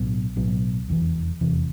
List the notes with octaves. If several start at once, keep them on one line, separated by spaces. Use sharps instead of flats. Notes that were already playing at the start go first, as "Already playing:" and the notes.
Already playing: B1 A2 F#3 B3
B1 A2 F#3 B3
F1 E2 C3 E3
F1 E2 C3 E3